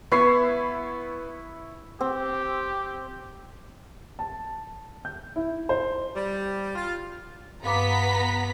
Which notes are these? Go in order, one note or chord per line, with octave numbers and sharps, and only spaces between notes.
B3 E4 B5 C#6 C7
C4 G4
A5
G6
E4
C5
G3
F4
G2 B3 F5 A#5 D6 B6